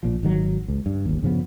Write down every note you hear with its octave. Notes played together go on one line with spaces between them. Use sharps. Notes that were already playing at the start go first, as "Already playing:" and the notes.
A#1 A#2 F3
G#1 D#3 F#3
C#2
G2
G1 D#2
G2 C#3 F3 B3